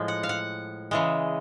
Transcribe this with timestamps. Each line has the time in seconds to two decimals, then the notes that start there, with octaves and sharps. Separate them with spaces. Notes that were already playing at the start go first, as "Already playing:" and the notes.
Already playing: A2 F3 G#3
0.08 F#5
0.23 F5
0.29 F#5
0.91 C#3 E3 G#3